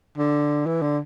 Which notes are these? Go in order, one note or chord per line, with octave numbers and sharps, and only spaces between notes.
D3
E3
D3